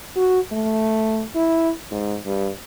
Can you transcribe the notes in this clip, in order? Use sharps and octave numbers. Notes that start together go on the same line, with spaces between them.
F#4
A3
E4
G#2
G2